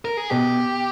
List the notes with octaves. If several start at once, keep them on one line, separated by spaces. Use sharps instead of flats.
A#4
G#4
B2 G4